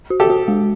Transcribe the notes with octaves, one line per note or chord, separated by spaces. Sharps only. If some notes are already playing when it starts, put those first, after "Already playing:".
F#4
G4 A4
F#4
G#3